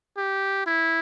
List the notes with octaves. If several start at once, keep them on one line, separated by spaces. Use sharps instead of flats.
G4
E4